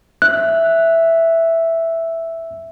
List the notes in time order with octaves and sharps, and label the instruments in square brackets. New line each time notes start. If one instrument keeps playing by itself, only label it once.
[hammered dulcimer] E5 [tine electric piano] F#6